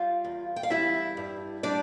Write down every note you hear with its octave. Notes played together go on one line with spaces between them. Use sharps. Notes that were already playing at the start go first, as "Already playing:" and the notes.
Already playing: G3 F4 F5
E2
G5
F5
G3 E4 E5
G2
G3 D4 D5